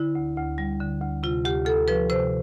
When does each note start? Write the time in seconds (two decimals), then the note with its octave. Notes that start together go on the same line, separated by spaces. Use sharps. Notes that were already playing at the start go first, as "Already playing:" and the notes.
Already playing: D3 E4
0.15 D2
0.37 D2
0.58 G3
0.80 D3
1.01 D2
1.23 C3 F4
1.45 D2 G4
1.66 D2 A4
1.88 F3 B4
2.09 C3 C5